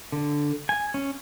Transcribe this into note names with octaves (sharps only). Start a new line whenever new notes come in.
D3
G#5
C#4